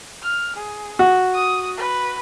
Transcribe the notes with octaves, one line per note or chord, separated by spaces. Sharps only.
F6
G#4
F#4
D#6
B4